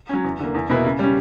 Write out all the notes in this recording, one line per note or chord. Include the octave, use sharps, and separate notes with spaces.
F#3 C#4
E2
D3 A#3
E2
B2 A#3 E4 B4
C#3
G3 C#4